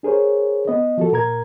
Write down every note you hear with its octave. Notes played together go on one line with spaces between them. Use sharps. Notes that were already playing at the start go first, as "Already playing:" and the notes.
D4 G#4 A#4 C5 C#5
B3 D#5
F3 F#4 A4
A#2 A#4 A#5 G#6